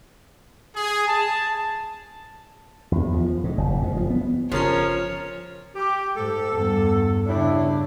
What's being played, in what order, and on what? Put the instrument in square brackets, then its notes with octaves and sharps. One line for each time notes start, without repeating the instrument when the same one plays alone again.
[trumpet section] G#4
A5
[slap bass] E2
F3
G#2
F#1
G#2
F3
B3
[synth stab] G1 C#3 C7 [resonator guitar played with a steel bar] F3 C#4 [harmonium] A#4 [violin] C#5
[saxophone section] G4
[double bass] G#2 [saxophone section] A4
[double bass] E2 G2
[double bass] C#3 D4 [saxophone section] E4 G4